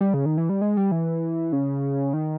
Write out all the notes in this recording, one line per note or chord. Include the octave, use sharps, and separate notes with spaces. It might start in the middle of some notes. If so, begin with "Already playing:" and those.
G3
C#3
D#3
E3
G3
G#3
G3
E3
C#3
D#3